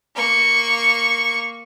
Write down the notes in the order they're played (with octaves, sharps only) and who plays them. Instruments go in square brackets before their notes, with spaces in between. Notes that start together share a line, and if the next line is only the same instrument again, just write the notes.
[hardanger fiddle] A#3 C#6